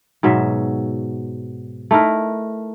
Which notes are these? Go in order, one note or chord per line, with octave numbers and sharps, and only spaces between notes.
G#2 B2 F#3 E5
A3 D#4 E4 A#4